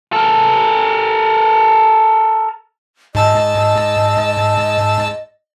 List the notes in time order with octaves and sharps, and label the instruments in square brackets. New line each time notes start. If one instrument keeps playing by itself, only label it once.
[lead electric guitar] A4 A#4
[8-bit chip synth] G#2 A5 E6 [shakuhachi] D#5